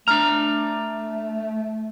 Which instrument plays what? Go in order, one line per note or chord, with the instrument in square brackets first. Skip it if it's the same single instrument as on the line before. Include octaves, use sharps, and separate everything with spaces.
[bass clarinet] A3 [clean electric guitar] D4 A#5 [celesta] F6